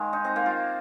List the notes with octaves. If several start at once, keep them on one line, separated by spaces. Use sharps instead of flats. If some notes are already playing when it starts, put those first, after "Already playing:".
Already playing: D#3 G#3 A#3
D#4
C4
A#3
F4